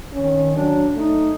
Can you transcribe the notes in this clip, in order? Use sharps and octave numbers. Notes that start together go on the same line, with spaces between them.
D#3 C#4
F#3 D4
A3 D#4